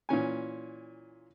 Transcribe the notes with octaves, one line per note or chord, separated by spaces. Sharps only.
A#2 E3 C#4 G#5